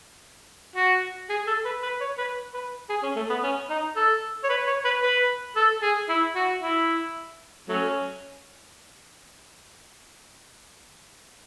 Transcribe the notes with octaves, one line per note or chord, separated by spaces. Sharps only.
F#4
G#4
A4
B4
B4
C#5
B4
B4
G#4
C#4
A3
B3
C#4
D#4
A4
C#5
B4
C#5
B4
B4
A4
G#4
E4
F#4
E4
F#3 A3 C#4